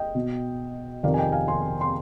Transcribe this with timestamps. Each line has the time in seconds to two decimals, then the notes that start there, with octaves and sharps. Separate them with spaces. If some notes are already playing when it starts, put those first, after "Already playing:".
Already playing: D#5 G5
0.15 B2
1.03 F2 C3 D#3 D5 F5
1.14 G#5
1.18 D#5 G5
1.32 F5 G#5
1.48 G#5 C6
1.81 C6